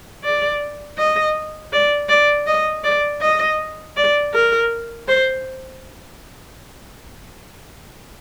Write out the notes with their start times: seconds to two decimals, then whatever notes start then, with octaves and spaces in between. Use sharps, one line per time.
0.24 D5
0.98 D#5
1.73 D5
2.09 D5
2.47 D#5
2.84 D5
3.21 D#5
3.97 D5
4.34 A#4
5.08 C5